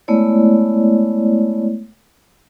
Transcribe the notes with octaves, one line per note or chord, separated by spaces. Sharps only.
G#3 A3 B3 E4 C#5 D5